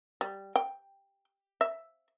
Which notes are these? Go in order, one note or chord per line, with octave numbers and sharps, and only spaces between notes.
G3
G5
E5